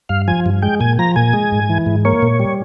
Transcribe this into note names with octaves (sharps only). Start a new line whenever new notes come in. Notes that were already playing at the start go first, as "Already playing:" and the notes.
G2 F5
F3 G#5
G2
G#3 G5
A#2 G#5
F3 A#5
A#2 G#5
G#3
G#2
E3
G#2
A#3 C#5
A#2
G3